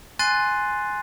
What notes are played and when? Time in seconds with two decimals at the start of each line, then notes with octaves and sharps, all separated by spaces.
0.19 G#5 C6 F#6 A6 C7 D#7